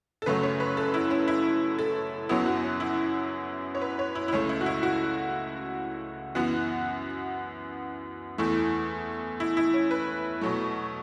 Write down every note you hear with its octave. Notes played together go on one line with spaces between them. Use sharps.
A4
F#2 C#3 F#3 A3 B4
C#5
B4
A4
E4
C#4
E4
A4
F#2 F#3 B3 E4
F#4
C#4
E4
C#5
B4
C#5
E4
E4
C#2 C#3 A3 C#4
E4
F#4
E4
F#4
F#2 E3 B3 F#4
E2 E3 A3 E4
E4
E4
C#4
B4
B2 F#3 A3